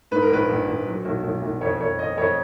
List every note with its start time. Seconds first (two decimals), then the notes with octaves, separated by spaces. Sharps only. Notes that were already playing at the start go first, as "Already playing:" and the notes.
0.11 G#2 B4
0.22 A#4
0.30 A#1 B4
0.49 A#1
0.67 A#1
0.86 F#3
1.05 B1
1.24 B1
1.42 B1
1.61 F2 C#5
1.80 F2 C#5
1.99 F2 D#5
2.18 F2 C#5